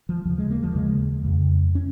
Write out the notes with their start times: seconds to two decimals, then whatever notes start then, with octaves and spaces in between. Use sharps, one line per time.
0.09 F3
0.25 D#2 C#3 F3
0.38 G#3
0.50 A#3
0.63 F3
0.75 D#2 C#3 G#3
1.25 F2 C#3
1.75 C#4